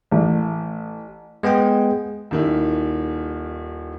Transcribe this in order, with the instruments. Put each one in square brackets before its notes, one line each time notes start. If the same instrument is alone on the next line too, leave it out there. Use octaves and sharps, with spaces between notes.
[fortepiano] A1
[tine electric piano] G#3 B3 G#4 G5
[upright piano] D#1 D#3 E4